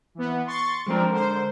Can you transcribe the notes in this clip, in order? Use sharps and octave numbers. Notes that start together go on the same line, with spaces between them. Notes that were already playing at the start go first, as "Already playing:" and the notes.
E3 B3
C6 C#6 A6
F3 G#3 C4 D4 A#4
D3 C5